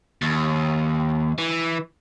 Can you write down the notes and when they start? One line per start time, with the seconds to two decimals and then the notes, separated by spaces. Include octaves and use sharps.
0.22 D#2
1.38 E3